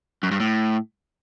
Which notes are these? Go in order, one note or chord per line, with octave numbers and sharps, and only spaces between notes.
F#2
G2
A2